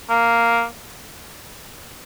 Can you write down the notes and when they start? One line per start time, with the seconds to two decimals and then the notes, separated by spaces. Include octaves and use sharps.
0.09 A#3